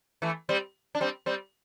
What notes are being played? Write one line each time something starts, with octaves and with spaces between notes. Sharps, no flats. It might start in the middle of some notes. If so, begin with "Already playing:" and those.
E3 A3
G3 C4
D4
G3 C4
G3 C4